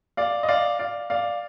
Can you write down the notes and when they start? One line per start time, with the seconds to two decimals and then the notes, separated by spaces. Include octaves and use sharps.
0.17 D5 F5
0.43 D#5
0.49 D5 F5
0.79 D5 F5
1.10 D5 F5